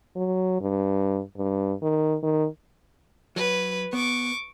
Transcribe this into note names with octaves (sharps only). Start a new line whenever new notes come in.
F#3
G2
G2
D#3
D#3
F#3 B4
B3 C#6 D6